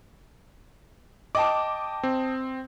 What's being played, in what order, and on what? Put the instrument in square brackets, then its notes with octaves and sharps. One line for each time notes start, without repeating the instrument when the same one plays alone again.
[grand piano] D#5 G5 A5 [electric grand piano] D6
[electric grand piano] C4